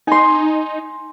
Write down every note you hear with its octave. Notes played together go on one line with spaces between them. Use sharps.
D#4 G#5 C6